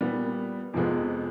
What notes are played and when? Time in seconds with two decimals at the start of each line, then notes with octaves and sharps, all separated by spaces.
0.01 A#2 G3 B3
0.74 F2 C3 F3 G#3 B3